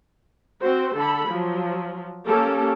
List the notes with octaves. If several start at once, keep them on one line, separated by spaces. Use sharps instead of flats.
C4 F#4 C5
D3 A4 B5
F3 F#3
A#3 C#4 G4 A4